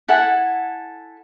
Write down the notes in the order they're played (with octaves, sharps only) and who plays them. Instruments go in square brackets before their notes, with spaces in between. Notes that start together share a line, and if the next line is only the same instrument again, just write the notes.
[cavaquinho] E4 A4 F#5 G#5